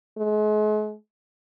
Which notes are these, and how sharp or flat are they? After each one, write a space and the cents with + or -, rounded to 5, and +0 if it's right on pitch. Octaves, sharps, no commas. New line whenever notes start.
G#3 +40